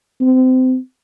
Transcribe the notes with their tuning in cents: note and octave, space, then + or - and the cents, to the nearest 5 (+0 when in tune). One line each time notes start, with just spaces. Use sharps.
C4 -25